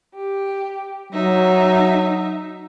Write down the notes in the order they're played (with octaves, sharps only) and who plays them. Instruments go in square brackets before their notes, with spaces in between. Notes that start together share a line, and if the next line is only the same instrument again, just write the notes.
[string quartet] G4
[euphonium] F#3 [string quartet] D#4 E5